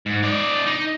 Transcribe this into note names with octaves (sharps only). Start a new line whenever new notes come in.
G#2
D#4 D5
D#4